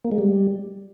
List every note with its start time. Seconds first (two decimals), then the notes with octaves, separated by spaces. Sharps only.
0.04 A#3
0.11 G#3
0.18 G3